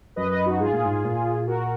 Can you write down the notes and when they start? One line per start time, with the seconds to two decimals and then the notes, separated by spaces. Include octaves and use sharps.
0.16 F#2 B4 D#5
0.31 B4 D#5
0.46 D#4 F#4
0.60 G#2 F4 G#4
0.73 A#2
0.85 G#2
1.05 A#2
1.47 F#4 A#4